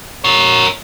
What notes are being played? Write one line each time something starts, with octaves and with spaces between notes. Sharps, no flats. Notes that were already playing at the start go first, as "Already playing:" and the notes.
A#4 C#5